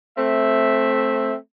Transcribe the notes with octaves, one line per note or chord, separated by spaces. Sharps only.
A3 C4 E5